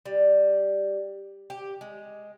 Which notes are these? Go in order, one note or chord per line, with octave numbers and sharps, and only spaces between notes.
G3
G4
G#3